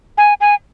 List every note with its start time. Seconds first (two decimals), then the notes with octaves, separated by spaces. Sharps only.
0.18 G#5
0.41 G#5